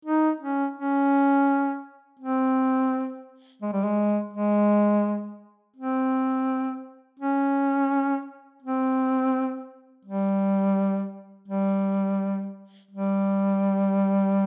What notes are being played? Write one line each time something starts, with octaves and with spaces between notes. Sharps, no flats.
D#4
C#4
C#4
C4
G#3
G3
G#3
G#3
C4
C#4
C4
G3
G3
G3